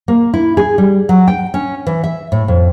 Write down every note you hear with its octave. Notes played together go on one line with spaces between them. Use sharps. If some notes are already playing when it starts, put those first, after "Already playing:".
A#3
E4
G#4
G3
F#3
G5
C#4
E3
E5
A2
F2